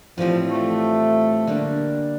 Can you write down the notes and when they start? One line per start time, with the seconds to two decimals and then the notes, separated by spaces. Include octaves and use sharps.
0.17 A2 E3 F3 G3 C4 F4
0.50 A3
1.47 D3 G3 A#3 D4